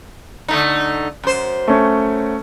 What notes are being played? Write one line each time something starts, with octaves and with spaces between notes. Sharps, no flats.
D3 A3 D#4
F#2 C5
A3 C#4